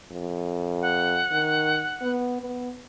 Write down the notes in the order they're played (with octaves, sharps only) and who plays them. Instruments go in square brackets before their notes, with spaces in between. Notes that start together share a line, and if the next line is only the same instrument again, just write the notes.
[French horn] F2
[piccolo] F#5
[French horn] D#3
B3
B3